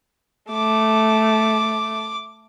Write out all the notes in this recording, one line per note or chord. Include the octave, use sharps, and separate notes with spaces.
A3 D6